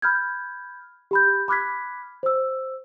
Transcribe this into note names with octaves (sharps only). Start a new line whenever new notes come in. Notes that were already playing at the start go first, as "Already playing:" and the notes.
B5 F6 G6 G#6
G4 B5 G6
B5 D6 F6 F#6 G#6 B6
C5 E6